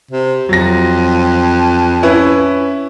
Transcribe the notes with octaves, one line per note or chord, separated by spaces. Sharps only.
C3
F2 F#3 A#6
C#4 E4 B4